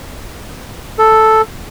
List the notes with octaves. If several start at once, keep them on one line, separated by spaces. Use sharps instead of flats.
A4